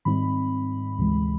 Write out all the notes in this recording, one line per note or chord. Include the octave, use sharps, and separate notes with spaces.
G#2 D#3 G3 C4 D#4 B5
D2 C3 E3 G#3